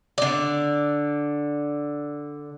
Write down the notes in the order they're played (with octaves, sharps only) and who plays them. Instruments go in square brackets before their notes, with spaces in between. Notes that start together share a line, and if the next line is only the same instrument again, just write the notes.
[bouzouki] D3 D5